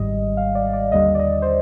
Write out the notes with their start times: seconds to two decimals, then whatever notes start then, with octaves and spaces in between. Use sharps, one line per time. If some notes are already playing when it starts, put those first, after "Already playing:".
Already playing: G#1 G#2 G3 D#5
0.37 F5
0.55 D5
0.73 D5
0.92 D#2 D3 G3 D#5
1.15 D5
1.20 D#5
1.42 C5